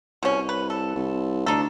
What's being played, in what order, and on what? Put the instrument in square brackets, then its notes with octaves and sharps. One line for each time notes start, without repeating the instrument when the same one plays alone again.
[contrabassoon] C2 [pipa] B2 C#4
[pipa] B4
A4
[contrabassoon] C2
[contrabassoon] D2 [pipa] D4 D#4 A4